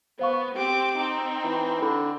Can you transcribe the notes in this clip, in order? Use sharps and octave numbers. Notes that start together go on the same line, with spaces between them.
B3 C5 F5 C#6
C4 G4 D6
C4 D#4 G5
E3
D3 B5